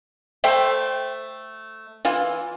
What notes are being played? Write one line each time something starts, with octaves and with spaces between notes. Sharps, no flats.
A3 C5 E5 G5
E3 F4